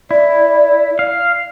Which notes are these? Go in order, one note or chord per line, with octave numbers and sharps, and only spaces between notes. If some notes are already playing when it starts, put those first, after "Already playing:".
E4 D5
F5